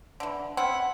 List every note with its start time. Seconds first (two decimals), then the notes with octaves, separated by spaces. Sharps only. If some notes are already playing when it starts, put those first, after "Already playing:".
0.20 D3 E3
0.57 C4 C#4 E4 F#5